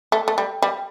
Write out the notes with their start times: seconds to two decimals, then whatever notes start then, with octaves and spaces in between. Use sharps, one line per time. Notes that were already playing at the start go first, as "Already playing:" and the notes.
0.12 A3
0.28 A3
0.38 G3
0.62 G3